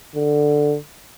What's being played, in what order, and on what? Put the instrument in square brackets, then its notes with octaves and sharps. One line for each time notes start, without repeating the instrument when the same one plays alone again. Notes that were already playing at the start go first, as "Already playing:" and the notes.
[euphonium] D3